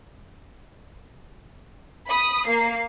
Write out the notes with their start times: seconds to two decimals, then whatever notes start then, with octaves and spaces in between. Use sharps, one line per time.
2.07 B5 D#6
2.47 A#3 C7